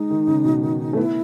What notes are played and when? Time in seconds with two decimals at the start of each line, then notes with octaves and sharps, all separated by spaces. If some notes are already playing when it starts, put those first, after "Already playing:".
Already playing: G#3 D#4
0.10 D#3
0.27 C#3
0.45 B2
0.62 D#3
0.93 A3
0.97 B3 E4